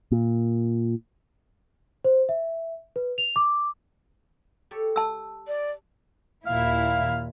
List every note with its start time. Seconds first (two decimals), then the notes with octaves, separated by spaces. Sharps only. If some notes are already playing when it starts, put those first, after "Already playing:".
0.12 A#2
2.04 C5
2.29 E5
2.96 B4
3.18 F7
3.36 D6
4.71 G4 A4 C#5
4.96 A5 E6
5.47 D5
6.47 D#2 A#2 E4 F5